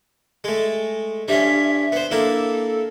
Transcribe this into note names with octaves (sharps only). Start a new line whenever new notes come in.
G#3 A3
G2 C#4 E5
B3 C5
A#3 D4 E4 A4